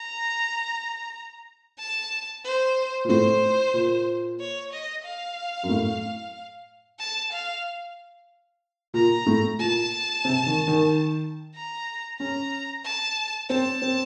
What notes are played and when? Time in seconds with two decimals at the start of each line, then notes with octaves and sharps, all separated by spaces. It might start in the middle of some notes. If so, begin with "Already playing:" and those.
Already playing: A#5
1.79 A5
2.44 C5
3.05 A#2
3.09 A2 C5
3.74 A#2
4.40 C#5
4.72 D#5
5.04 F5
5.63 F#2
5.69 A2
6.99 A5
7.32 F5
8.94 A#2 A#5
9.26 A2
9.59 A#2 A5
10.25 C3
10.46 D#3
10.67 D#3
11.54 A#5
12.20 C#4 A#5
12.84 A5
13.49 C4 A5
13.82 C4